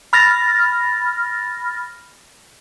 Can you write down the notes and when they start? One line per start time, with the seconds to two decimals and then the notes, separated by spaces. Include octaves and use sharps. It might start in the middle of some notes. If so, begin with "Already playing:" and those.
0.13 B5 F6 A6 A#6